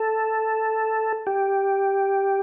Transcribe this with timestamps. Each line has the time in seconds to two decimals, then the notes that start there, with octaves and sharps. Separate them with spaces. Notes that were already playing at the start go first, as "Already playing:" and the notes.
Already playing: A4
1.27 G4